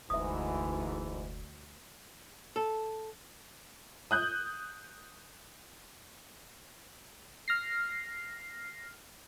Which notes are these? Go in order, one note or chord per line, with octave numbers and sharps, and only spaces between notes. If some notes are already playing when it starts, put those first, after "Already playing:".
F1 D2 G#2 E3 E5 D#6
A4
D#6 F#6 G6
F6 A#6 C7